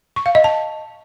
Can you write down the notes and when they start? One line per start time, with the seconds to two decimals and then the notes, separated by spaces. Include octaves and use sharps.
0.16 C#6
0.26 F5
0.35 D#5
0.44 A5